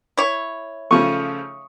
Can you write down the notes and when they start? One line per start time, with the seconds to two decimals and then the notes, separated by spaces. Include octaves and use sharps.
0.17 E4 C#5
0.91 C#3 F3 A3 C#6 D#6